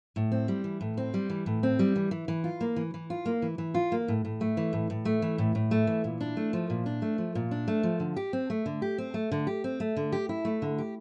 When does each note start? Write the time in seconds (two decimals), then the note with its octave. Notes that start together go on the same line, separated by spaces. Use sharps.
0.16 A2
0.32 C4
0.48 G3
0.64 E3
0.81 A2
0.97 C4
1.14 G3
1.30 E3
1.46 A2
1.63 C4
1.79 G3
1.96 E3
2.11 E3
2.28 E3
2.44 F4
2.61 A#3
2.76 E3
2.94 E3
3.10 F4
3.25 A#3
3.42 E3
3.58 E3
3.74 F4
3.92 A#3
4.08 A2
4.25 A2
4.41 A3
4.57 E3
4.73 A2
4.90 A2
5.05 A3
5.22 E3
5.38 A2
5.55 A2
5.71 A3
5.87 E3
6.04 A#2
6.20 D4
6.37 A3
6.53 F3
6.70 A#2
6.86 D4
7.02 A3
7.18 F3
7.35 A#2
7.51 D4
7.68 A3
7.83 F3
8.00 D3
8.16 G4
8.33 C4
8.50 A3
8.66 D3
8.82 G4
8.98 C4
9.14 A3
9.32 D3
9.47 G4
9.64 C4
9.80 A3
9.96 D3
10.12 G4
10.29 E4
10.45 A3
10.62 D3
10.78 G4